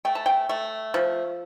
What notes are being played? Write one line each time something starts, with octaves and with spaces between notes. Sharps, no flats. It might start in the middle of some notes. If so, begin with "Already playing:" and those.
A3 G5
A5
G5
A3
F3